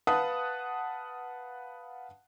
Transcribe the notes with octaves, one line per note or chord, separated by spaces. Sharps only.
B4 F5 F#5 A5 D#6 F#6